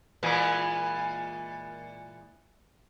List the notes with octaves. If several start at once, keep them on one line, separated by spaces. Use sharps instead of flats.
A#2 E3 G#3